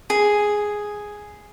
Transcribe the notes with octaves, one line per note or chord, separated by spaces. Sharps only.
G#4